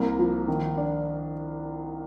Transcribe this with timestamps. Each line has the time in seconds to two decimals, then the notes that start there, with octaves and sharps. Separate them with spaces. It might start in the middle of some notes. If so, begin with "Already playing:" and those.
Already playing: C2 A#3
0.19 F3
0.48 D#3
0.77 D4